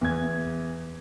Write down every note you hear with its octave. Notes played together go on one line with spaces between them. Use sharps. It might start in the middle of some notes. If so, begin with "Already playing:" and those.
E2 G#6